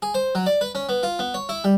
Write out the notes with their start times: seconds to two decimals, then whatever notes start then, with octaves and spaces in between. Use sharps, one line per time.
0.02 G#4
0.14 C5
0.35 F#3
0.46 D5
0.61 B4
0.75 C#4
0.89 B3
1.03 F4
1.19 B3
1.34 C#5
1.49 E4
1.64 G3